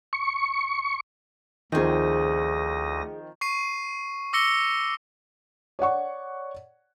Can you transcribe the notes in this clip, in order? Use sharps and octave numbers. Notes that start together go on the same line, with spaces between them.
C#6
D2 D#3 F3 C4 G#4 G5 D#6 A#6
C#6 C7 D#7
D6 E6 A#6 C#7 G7
C#5 D5 F#5 C#6